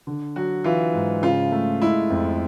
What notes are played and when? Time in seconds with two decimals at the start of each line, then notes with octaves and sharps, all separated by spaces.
0.07 D3
0.36 F#3 F#4
0.64 E3 F4
0.94 G#2
1.22 C#3 F4
1.52 A3
1.82 G#3 E4
2.10 F2